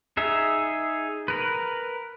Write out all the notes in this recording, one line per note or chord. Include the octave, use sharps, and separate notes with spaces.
D#4 G#4 E5
A#4 B4